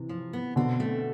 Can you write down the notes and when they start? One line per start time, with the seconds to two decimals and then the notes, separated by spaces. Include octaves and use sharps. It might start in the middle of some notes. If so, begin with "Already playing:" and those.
Already playing: C3 E3
0.09 F3
0.33 B3
0.56 B2 D3 C4
0.80 A3